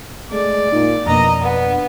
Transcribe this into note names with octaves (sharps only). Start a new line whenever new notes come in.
G#3 A3 D5
A#2 D#4
F2 B2 A#3 D4 D#5 A#5
B3